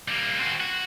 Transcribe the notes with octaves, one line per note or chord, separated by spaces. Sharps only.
G3 A#3
C4 F#4
F#4